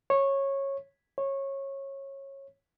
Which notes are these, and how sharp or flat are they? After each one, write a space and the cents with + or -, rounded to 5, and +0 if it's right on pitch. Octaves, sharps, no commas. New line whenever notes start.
C#5 -15
C#5 -20